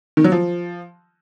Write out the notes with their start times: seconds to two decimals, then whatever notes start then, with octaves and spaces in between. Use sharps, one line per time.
0.17 D#3
0.24 F#3
0.32 F3